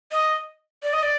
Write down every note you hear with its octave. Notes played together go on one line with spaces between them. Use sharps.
D#5
D5
D#5
D5